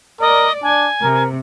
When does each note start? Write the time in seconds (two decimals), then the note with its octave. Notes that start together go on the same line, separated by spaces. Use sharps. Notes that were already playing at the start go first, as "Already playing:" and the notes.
0.21 A#4 D5 D#5
0.63 D4 G#5
1.03 C3 A#4